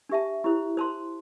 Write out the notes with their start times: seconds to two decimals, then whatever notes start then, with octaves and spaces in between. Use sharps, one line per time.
0.09 D4 G4 E5 A5
0.44 E4 G4 C5
0.77 C5 A5 C6